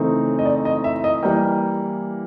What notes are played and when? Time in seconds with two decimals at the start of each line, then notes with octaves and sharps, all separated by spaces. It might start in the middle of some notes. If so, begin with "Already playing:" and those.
Already playing: C#3 E3 A3 C4 D#4
0.39 D#5
0.45 D5
0.65 D#5
0.84 E5
1.04 D#5
1.23 E3 G3 A#3 G5